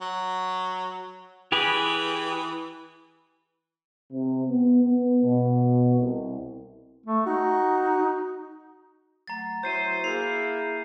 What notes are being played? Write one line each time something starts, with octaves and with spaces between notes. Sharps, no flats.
F#3
E3 G4 G#4 B4
C3
B3
B3
B2
C2
A3
D#4 F#4
F#3 A3 F#5 A#5 A6
F#3 E4 F#4 C5 E5 G6 C7 D#7
A#3 E4 G#4 G#5 C7 F7